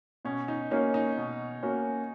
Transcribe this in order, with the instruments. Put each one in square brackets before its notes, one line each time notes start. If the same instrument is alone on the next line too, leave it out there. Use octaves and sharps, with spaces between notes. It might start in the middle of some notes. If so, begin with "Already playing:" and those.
[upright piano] B2 [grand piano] C#4
[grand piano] D#4
[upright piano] A#3 C#4 F#4 C#5 [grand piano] D#4
[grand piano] D#4
[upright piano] B2
A#3 C#4 F#4 C#5